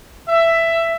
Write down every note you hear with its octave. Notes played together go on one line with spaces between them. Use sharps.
E5